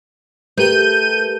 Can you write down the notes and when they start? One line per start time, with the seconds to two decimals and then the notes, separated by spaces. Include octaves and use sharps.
0.57 A3 G4 A#4 B4 G6 D#7